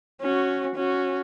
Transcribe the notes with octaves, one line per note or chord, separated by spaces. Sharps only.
C#4 F#4
C#4 F#4